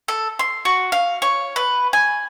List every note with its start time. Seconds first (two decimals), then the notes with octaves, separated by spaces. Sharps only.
0.08 A4
0.39 C6
0.65 F#4
0.92 F5
1.22 C#5
1.56 B4
1.93 G#5